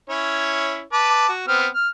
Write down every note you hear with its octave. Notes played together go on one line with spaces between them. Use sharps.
C#4 E4 C#5
B4 A5 D6
F#4
B3 C4 F6
F6